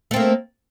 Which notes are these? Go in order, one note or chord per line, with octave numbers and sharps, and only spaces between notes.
A3 A#3 C4